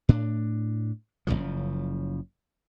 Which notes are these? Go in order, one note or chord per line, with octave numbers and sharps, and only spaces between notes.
A2 D4
F#1 D#2 C#3 F3